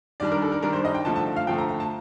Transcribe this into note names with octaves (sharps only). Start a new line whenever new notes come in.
D#3 G3 D4 D5
A#4
A4
A#4
D#3 G3 D4 A#4
C5
D#5
G5
D3 F3 A3 A5
A5
F5
D3 F3 A3 G5
A#5
A#5
A5